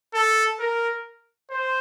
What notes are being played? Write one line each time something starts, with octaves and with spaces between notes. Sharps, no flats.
A4
A#4
C5